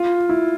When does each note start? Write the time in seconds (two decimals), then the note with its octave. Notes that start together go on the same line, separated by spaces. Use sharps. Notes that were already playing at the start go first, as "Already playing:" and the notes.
Already playing: F4
0.29 E4